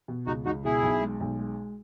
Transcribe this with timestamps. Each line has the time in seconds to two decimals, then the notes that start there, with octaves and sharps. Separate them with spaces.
0.08 B2
0.27 C#2 D#4 F#4
0.46 C#2 D#4 F#4
0.65 B2 E4 G#4
0.82 B1
1.01 G#3
1.20 B1
1.39 G#3